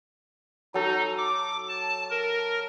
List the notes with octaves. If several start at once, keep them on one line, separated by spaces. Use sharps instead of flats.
F#3 D#4 A4
D6
A5
A#4